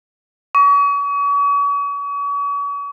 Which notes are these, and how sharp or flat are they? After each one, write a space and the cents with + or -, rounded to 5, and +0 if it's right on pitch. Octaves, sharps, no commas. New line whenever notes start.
C#6 +40